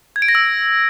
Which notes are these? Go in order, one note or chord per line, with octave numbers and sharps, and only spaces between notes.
G#6
D7
A#6
E6